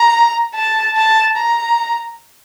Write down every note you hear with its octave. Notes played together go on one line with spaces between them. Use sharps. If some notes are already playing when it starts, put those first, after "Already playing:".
Already playing: A#5
A5
A5
A#5